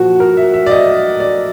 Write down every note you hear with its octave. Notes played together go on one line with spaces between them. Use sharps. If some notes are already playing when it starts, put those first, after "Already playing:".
Already playing: A#2 F3 F#4
A#4
E5
E5
D5
D#5
D5